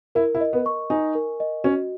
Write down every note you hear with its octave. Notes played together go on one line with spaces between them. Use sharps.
E4 A#4
E4
D#5
B3
C#6
D#4 G#5
A#4
D#5
C#4 F#4